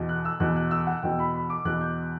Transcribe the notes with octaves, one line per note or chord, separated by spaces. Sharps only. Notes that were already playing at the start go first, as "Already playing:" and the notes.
Already playing: E2 B2
F#6
E6
E2 B2 F#6
F#6
E6
F#5
E2 B2 G5
B5
B5
D6
E2 B2 F#6
G6